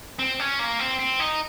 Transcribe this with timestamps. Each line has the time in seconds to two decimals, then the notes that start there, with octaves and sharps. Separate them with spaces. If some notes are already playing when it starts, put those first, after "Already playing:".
0.19 C4
0.40 C#4
0.59 A#3
0.79 C4
0.99 C4
1.20 D#4